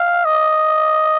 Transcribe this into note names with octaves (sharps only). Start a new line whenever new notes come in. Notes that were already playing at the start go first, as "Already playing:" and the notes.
Already playing: F5
D#5